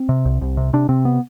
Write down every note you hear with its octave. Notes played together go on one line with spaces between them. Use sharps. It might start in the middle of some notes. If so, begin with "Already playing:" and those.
Already playing: C4
C3
C2
C2
C3
C3 D4
C3 C4
B3